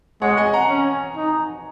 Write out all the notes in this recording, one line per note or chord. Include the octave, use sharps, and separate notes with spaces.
G#3 C#5 F#5
D#5 G#5
F#5 A#5
C#4
D#4